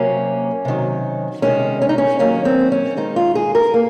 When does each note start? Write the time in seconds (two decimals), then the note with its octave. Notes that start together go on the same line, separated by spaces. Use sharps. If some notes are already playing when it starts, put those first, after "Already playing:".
Already playing: C3 F#3 A#3 C#4
0.65 C3 D#3 F#3
1.42 C3 D#3 G#3 C#4
1.82 C#4
1.89 D#4
1.98 C#4
2.19 D#3 F#3 A#3 C#4
2.45 C4
2.72 C#4
2.97 D#3 G#3 D#4
3.16 F4
3.35 G#4
3.55 A#4
3.74 A#3